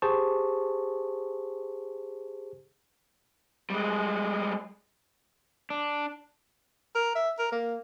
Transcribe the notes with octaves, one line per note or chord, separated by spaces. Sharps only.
G4 G#4 C5 A5 C#6
G3 G#3
D4
A#4
E5
A#4
A#3